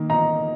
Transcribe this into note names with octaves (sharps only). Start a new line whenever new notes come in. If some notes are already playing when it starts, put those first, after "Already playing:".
Already playing: D#3 A#3
D#4 A#5